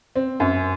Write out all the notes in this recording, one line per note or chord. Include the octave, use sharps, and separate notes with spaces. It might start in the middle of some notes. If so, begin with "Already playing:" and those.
C4
F#2